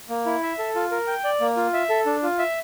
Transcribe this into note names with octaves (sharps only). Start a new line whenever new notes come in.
A#3
E4
E5
A4
F4
A#4
G5
D5
A#3
F4
E5
A4
D4
F4
E5